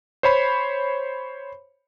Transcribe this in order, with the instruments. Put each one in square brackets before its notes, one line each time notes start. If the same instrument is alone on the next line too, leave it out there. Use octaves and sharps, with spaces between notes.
[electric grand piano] C5 C#5 B5